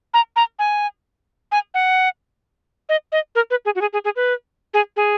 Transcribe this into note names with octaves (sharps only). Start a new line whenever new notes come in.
A#5
A#5
G#5
G#5
F#5
D#5
D#5
A#4
B4
G#4
F#4
G#4
G#4
G#4
B4
G#4
G#4